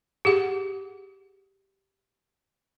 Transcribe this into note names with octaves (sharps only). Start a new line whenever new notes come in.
G4 G#4 F#5